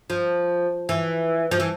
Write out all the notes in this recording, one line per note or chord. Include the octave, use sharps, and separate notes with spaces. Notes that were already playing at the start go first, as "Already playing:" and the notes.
F3
E3
F3
E3